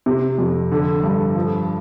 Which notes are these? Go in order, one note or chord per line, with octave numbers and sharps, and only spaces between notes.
C3
F2
D3
G2
F3